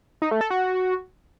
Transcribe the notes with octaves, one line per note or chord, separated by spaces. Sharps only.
D#4
A3
A4
F#4